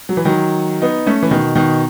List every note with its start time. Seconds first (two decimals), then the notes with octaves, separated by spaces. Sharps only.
0.09 F#3
0.17 E3
0.25 D#3 F#3
0.82 B3 D#4
1.06 A3 C#4
1.23 E3
1.31 B2 D#3
1.55 B2 D#3